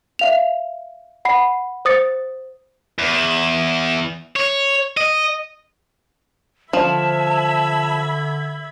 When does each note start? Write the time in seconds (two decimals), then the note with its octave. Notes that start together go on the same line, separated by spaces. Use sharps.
0.19 E5 F5 F7
1.25 F#5 B5 C7
1.85 C5 D#6 A6 C#7
2.99 E2
4.36 C#5
4.97 D#5
6.73 D3 F3 E5 A5 B5 G#6